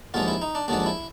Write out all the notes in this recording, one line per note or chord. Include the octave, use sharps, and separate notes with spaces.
D#2 D3 F3 G#3 F4
E4
D#4
D4
D#2 D3 F3 G#3 D4
E4